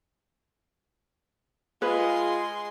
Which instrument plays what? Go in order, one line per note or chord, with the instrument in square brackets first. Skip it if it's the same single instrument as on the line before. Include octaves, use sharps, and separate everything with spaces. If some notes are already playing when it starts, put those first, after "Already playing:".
[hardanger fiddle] G#3 C6 [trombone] F4 [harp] G#4 D#5 [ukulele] B4